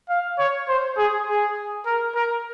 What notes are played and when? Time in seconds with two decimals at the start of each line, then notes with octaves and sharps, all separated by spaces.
0.09 F5
0.39 C#5
0.68 C5
0.97 G#4
1.27 G#4
1.86 A#4
2.15 A#4